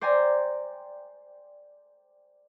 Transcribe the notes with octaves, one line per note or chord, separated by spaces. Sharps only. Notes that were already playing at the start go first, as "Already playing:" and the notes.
C5 D5 G5 G#5 A#5 C6